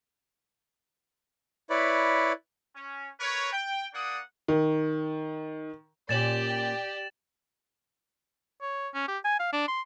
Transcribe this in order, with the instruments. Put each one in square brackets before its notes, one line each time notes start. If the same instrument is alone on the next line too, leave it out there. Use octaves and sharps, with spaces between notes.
[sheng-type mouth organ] E4 B4 C#5 D5 B5
[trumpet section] C#4
A#4 B4 C#5
G5
A#3 D4 D5 F#5 D#6
[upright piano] D#3
[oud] A#2 C#4 [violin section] G4 D5 [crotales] A6 E7 F#7
[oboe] C#5
C#4
G4
G#5
F5
D4
C6